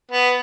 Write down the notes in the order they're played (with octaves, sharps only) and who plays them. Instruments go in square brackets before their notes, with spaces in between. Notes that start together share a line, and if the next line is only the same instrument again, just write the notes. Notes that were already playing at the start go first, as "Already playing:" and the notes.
[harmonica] B3